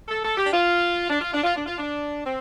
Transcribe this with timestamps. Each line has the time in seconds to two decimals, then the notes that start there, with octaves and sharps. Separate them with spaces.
0.08 A4
0.23 A4
0.37 G4
0.46 D4
0.52 F4
1.10 D4
1.20 F4
1.33 D4
1.43 F4
1.55 D4
1.66 F4
1.77 D4
2.25 C4